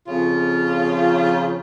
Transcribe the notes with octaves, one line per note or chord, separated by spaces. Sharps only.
F2 C#3 F4